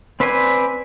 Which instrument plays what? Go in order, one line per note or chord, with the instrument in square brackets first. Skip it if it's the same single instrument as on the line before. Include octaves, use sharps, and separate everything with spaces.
[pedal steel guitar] C4 B4 C5 D5 G#5